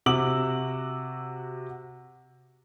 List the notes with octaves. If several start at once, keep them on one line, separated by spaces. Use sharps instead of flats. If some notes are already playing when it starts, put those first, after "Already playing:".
C3 F#4 D6 E6 F#7